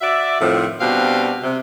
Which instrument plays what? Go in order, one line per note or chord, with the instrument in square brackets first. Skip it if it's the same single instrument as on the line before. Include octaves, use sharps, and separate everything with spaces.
[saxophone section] F#4 D5 E5
F2 A2 D#3 F3
B2 G3 C4 D4 F5
C3